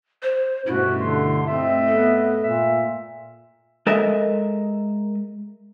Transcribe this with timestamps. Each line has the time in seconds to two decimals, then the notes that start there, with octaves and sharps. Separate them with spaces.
0.22 C5
0.67 G2 B2 A3 C#4 E4 F#4
1.00 D3 C6
1.46 A3 C4 D#5 E5
1.88 B3 A4
2.43 A#2 E5
3.87 G#3 A4 A#4 D#5 E5